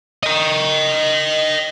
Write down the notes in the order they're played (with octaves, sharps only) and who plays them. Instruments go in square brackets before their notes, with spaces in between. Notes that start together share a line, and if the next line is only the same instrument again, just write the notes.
[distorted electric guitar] D#5 G5